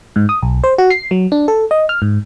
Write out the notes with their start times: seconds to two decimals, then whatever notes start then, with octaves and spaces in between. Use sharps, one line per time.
0.16 G#2
0.29 D#6
0.43 B1
0.64 C5
0.78 F#4
0.90 C7
1.11 F#3
1.32 D4
1.48 A4
1.71 D#5
1.89 F6
2.02 G#2